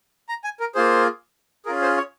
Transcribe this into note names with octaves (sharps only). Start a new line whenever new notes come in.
A#5
G#5
A#4
A#3 F4 G#4 C5
C#4 F4 G#4 A#4
C5
C#5